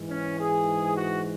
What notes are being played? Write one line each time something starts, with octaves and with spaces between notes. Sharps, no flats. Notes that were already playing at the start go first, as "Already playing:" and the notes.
Already playing: G#2 E3
C#4
G#4
F#4